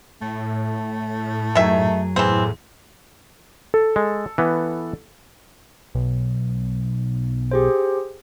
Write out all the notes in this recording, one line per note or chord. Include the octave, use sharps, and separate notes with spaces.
A2 A3
F#2 D#3 F#3 G#4 E5
E2 A2 E3 C4
A4
G#3
E3 B3
B1
G4 G#4 C5